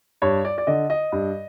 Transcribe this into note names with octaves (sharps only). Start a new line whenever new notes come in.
G2 C#5
D5
D5
D3 D#5
D#5
G2